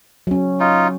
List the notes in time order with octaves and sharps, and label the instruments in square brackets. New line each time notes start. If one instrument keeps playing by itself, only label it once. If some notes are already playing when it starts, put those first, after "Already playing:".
[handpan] F#3 C#4
[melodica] D#4 F4